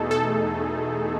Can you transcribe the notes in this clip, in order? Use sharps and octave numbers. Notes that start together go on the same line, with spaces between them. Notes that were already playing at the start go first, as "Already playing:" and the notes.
Already playing: E2 B2 A3 D#4 G#4 A4
A4